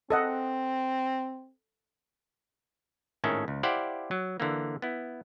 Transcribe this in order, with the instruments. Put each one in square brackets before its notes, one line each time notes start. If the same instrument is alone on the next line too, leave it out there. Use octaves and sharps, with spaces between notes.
[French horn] C4 [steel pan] A4 D#5 F#5
[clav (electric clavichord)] G#1 A2 D#3 C#4 E5 A5
C#2
E4 G4 C5 D5 F5 F#5
F#3
D3 E3 A#3
B3 E4